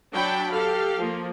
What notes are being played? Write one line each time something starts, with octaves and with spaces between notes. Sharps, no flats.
F#3 D4 G5 A5 B5
G4 A4 F5
F3 A#3